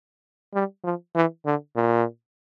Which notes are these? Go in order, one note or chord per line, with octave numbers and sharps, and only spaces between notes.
G3
F3
E3
D3
A#2